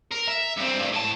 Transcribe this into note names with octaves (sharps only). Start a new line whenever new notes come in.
A#4
E5
G2 C4
G2 A3
A2 A5